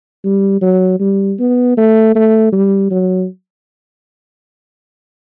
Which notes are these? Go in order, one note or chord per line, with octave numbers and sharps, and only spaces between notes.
G3
F#3
G3
B3
A3
A3
G3
F#3